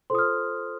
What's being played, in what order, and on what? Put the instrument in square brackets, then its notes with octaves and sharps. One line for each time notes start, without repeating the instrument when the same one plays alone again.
[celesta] F4 A4 C5 C6 D#6
F6